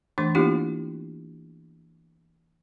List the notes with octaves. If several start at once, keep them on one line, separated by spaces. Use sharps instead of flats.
E3 A3 D4 C6
A#3 B3 D4 E4 F4 G4